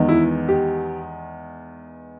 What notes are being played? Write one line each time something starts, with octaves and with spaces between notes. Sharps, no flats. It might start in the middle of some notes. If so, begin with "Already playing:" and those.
Already playing: E2 D#3 G#3 B3
E4
G4